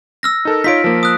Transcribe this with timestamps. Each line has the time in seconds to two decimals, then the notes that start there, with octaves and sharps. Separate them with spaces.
0.23 E6 F6 A#6
0.45 D#4 A4 A#4
0.64 D#4 F4 C#5 B6 D7
0.84 F3 A#3
1.03 D#6 F#6